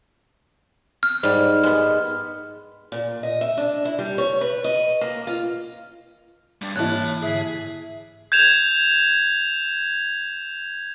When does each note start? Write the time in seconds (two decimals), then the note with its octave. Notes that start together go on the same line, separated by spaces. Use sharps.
1.03 F6
1.23 G#2 G3
1.63 G#3 B3
2.92 A#2
3.23 D#5
3.41 E5
3.58 D4
3.85 E4
3.99 G3
4.18 C#5
4.41 B4
4.64 D#5
5.01 A#3
5.27 F4
6.62 G3 D4
6.76 G#2 E3 A#3 E4 C#5 A5 F#6
7.23 G#2 D3 G#4 E5
8.32 G6 G#6 E7 F7